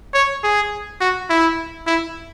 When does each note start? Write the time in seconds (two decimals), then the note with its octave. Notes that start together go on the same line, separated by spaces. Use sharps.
0.14 C#5
0.44 G#4
1.00 F#4
1.30 E4
1.87 E4